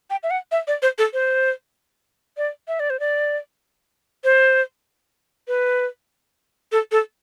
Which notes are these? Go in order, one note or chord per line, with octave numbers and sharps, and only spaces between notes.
G5
E5
F#5
E5
D5
C5
A4
C5
D5
E5
D5
C5
D5
C5
B4
A4
A4